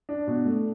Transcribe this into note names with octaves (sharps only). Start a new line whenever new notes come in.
D4
B2
A3